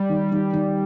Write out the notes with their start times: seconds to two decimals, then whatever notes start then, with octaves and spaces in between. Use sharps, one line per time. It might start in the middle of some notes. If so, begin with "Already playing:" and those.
Already playing: G3
0.09 D#3
0.32 D#3
0.53 D#3